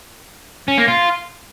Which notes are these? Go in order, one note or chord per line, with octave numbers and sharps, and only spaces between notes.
C#4
A#3
F4